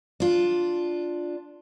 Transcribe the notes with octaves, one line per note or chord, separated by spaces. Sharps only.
D4 F4